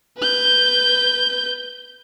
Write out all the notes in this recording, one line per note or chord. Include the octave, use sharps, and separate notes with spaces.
B4 G6